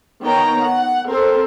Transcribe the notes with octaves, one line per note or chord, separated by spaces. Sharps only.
D#3 B3 C#5 G5 A#5
F#5
C4 A4 A#4 C5